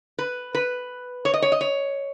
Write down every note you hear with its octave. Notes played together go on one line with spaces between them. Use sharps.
B4
B4
C#5
D#5
C#5
D#5
C#5